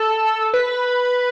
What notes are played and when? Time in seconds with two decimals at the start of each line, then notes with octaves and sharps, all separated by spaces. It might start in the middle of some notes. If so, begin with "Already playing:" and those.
Already playing: A4
0.54 B4